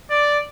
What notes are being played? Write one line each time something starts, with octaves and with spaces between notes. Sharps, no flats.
D5